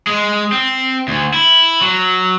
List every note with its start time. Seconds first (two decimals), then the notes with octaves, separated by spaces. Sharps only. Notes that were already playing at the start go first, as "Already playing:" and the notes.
0.07 G#3
0.52 C4
1.08 D2
1.34 E4
1.81 F#3